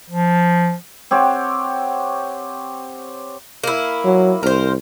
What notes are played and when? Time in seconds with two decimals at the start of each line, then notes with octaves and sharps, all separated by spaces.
0.10 F3
1.11 C4 G4 C#5 F#5
3.63 A#3 E4
4.04 F#3
4.43 C2 A#4 C5